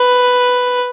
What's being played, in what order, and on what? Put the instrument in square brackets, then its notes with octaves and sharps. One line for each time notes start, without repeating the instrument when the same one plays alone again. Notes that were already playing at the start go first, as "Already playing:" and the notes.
Already playing: [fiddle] B4